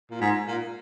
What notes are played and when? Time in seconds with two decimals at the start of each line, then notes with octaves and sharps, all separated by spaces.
0.11 A#2
0.21 G#2
0.48 A#2